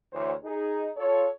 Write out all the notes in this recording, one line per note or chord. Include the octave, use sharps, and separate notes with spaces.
D2 E3 C5 C#5
D#4 G#4
F4 A4 C#5